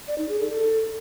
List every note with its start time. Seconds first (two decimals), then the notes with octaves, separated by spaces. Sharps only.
0.08 D5
0.18 D#4
0.29 G#4
0.39 A4
0.50 A4